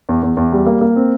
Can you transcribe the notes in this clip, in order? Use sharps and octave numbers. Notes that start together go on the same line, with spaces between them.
E2
E2
E2
G3
A#3
A#3
C4